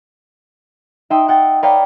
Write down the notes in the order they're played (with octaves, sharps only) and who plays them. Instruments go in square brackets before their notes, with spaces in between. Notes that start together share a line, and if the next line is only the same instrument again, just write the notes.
[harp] D#4 E5 G5 C6 D#6
F#5 G5 A6
B4 C#5 D5 F5 G5 A#5